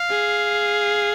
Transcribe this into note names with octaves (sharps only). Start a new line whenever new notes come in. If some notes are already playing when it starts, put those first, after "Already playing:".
Already playing: F5
G#4